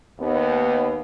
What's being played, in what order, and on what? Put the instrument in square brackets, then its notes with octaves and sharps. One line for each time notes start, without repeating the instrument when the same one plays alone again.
[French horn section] D#2 B3